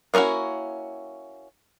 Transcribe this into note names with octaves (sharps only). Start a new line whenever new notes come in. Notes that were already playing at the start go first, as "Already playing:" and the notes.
A#3 B3 C#4 E4 F#4